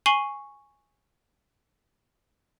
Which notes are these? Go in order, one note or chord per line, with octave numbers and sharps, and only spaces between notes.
G#5 C#6 C7 D#7 F#7 G7